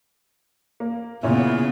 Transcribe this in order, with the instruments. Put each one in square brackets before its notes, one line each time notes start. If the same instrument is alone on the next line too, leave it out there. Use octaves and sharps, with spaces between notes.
[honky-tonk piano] A#3
[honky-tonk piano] A#2 C#4 E4 [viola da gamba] C#3 B3